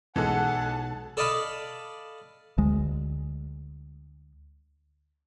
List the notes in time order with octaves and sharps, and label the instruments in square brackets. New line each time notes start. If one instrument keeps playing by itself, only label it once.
[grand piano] B1 [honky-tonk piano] E3 G#3 A4 [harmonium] F#5 [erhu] A5
[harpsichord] A4 D5 D#5 F5 B5
[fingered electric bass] D2 G#3